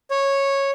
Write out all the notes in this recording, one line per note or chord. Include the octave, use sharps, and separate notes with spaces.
C#5